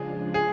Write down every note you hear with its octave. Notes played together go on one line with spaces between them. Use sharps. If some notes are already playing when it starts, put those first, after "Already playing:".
Already playing: C#3 F3 G#3 D4 F4 G#4
G#4